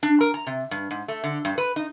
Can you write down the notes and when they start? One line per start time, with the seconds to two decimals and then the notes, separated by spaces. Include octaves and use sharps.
0.03 D4
0.21 A#4
0.34 A#5
0.47 C3
0.71 G2
0.91 G#2
1.08 A3
1.24 D3
1.45 G2
1.58 B4
1.76 D#4